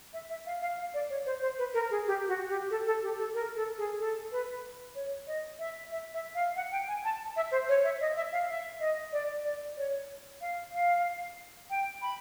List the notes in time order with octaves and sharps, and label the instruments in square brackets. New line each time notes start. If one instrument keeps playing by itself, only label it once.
[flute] E5
E5
F5
F5
F5
D5
C#5
C5
C5
B4
A#4
G#4
G4
F#4
G4
A4
A4
G4
A4
A#4
A4
G#4
A4
B4
C#5
D#5
E5
E5
E5
F5
F#5
G5
G#5
A5
E5
C5
C#5
E5
D#5
E5
F5
E5
D#5
D5
D5
C#5
F5
F5
G5
B5